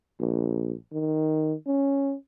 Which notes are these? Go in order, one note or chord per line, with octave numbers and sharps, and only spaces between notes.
A#1
D#3
C#4